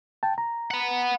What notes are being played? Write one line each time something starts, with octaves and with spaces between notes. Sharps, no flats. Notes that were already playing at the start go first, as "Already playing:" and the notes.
G5 A5
A#5
F#5 B5